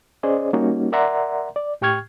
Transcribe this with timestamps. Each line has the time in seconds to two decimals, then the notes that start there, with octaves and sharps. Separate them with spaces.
0.23 C#4 G#4 C5 D5 D#5
0.53 G3 A#3 C#4 D#4 F#4
0.92 A#4 D5 E5 F#5 A#5 C6
1.56 D5
1.81 A2 G4 G5 C#6 F6 G#6